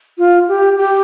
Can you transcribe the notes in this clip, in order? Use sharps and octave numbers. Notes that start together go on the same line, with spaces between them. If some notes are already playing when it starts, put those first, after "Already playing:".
F4
G4
G4